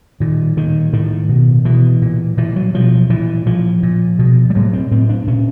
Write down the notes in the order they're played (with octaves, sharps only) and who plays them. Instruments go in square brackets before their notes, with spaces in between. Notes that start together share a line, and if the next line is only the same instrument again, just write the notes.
[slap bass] A#2 D#3
A#2 D#3
A2 D#3
B2
B2 E3
A#2
A#2 E3
F#3
B2 F3
A#2 E3
A#2 F3
A#2
B2
G3
A2 F#3
C4
A2 C4
D4
A#2 C#4